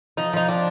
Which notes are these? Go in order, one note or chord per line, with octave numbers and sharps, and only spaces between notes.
F3 D#4
F3 D#4
C4 D4